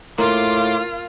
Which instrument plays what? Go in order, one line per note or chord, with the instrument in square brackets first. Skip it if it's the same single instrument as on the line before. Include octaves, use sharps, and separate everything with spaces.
[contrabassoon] A2 [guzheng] A#3 [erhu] F4 [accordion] C6 D6